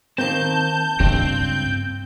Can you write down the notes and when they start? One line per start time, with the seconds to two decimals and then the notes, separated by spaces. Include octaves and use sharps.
0.18 D#3 A#3 C4 A5 G6
1.00 C#2 G2 A#3 C4